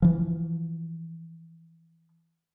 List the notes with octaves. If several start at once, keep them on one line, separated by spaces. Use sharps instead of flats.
E3 F3